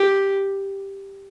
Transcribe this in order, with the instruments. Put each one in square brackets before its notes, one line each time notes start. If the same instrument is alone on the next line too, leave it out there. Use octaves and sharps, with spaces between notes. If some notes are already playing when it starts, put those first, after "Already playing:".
Already playing: [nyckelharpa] G4